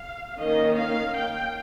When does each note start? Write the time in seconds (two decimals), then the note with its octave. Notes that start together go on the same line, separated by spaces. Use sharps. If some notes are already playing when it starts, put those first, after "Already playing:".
Already playing: F5
0.38 D#3 A#3 C#4 D#5
0.77 F5
1.17 G5